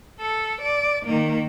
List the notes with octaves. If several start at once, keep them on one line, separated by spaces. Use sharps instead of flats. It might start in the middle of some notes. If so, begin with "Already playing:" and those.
A4
D5
D#3 A#3